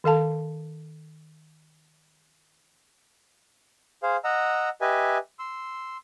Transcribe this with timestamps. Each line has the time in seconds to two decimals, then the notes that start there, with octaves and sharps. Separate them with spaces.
0.04 D#3 A4 F5 A5
4.03 G#4 C5 F5
4.24 D#5 F#5 A#5 E6
4.81 G4 B4 D#5 E5 G#5
5.39 C6 E6